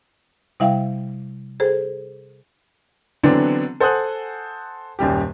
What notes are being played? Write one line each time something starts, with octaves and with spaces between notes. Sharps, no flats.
C3 G3 E4 E5 F5 G5
G#4 A4 C5
D3 E3 F#3 B3 C4 D4
A4 C5 F#5 G#5 D#6 F#6
D#1 F#2 G3 G4